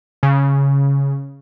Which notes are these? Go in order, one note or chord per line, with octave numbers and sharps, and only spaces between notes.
C#3